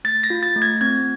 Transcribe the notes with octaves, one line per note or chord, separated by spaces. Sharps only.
A3 A6
A#6
F4
A6
A3
G#6
C4 G#6